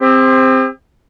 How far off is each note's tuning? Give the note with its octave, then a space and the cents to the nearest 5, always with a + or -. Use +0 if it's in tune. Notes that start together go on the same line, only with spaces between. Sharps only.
C4 +0 G4 +45 C5 +0